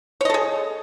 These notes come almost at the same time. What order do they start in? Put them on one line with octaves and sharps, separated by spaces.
C#5 D#5 A4 G#4